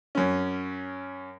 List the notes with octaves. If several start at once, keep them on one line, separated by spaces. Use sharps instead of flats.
F#2 C#4